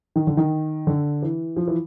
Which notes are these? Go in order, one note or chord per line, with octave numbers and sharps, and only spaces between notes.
D#3
D3
D#3
D3
E3
F3
E3